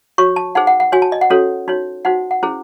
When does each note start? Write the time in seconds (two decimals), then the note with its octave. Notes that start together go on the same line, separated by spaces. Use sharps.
0.18 F#4 C#5 C#6
0.36 A5
0.55 D#4 G#4 C5 F#5
0.67 F#5
0.80 F#5
0.92 F#4 C#5 G#5
1.02 A5
1.12 D#5
1.21 F#5
1.30 C#4 F#4 A4 C#5
1.68 D#4 F#4 C#5
2.05 D#4 F#4 C5 F#5
2.31 F#5
2.43 C#4 E4 G#4 C5